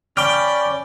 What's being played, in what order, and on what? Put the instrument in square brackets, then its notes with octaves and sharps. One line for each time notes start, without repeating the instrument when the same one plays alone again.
[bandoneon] C#4 D5 [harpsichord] G5 [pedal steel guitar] B5 D6 F6